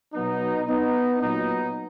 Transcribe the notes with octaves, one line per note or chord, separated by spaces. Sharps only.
B2 F#3 B3 D#4
B3 D#4
A#2 F#3 B3 D#4